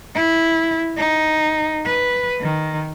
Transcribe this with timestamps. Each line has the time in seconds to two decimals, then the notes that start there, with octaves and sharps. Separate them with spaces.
0.15 E4
0.97 D#4
1.86 B4
2.41 D#3